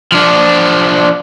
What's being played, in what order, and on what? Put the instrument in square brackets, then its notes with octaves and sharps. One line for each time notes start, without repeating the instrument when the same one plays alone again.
[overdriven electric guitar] F3 D4